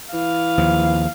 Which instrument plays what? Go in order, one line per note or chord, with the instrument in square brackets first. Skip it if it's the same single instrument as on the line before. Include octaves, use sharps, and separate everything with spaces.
[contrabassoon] E3 [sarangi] F5
[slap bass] D#2 F3